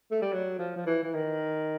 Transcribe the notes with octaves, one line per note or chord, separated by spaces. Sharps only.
A3
G3
F#3
F3
F3
E3
E3
D#3